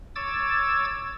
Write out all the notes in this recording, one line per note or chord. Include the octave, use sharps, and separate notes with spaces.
C#5 D6 E6 G#6 A6